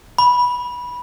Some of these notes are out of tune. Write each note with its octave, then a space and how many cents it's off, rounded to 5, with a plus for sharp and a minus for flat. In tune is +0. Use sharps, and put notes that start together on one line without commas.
B5 -15